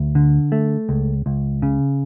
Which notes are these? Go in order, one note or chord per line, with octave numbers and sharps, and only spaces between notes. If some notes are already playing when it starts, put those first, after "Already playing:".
Already playing: D2
D3
A3
C#2
C#2
C#3